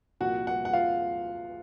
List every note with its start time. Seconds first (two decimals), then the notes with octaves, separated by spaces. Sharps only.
0.20 C2 A#2 F3 F#4 F#5
0.47 F#4 F#5
0.65 F#5
0.73 F4 F5